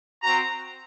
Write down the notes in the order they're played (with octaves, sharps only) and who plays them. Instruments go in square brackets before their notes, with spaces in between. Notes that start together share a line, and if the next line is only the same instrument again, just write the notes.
[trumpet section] C4 F#4 A#5